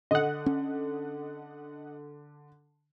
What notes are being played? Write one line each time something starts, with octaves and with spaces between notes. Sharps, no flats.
D3 D#5 F#5
C#4